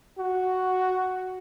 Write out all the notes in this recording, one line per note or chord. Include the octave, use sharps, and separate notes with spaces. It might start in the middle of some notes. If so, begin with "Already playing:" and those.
F#4